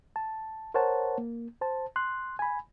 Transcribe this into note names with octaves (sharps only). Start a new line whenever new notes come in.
A5
A#4 C5 C#5 F#5 A5
A#3
C5 A5
C6 F#6
G#5 B5